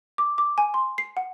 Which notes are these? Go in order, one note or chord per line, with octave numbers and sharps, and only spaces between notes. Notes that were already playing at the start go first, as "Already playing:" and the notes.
D6
D6
G#5
C6
C7
F#5